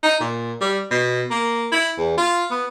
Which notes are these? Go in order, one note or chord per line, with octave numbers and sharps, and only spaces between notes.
D#4
A#2
G3
B2
A#3
E4
E2
F4
B3